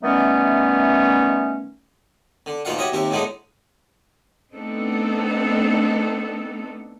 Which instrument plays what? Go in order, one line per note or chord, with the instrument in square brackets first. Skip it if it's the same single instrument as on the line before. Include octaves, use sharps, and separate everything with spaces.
[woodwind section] D#3 E3 G3 A3 B3 C#4
[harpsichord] D3
D2 A#2 D#3 F4 F5 F#5
F#4 G4 C#5 D#5 E5
D#2 C3 G4 A#4 E5
A2 D3 G#3 B3 D4 D#4
[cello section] A3 B3 C4 D4 D#4 A4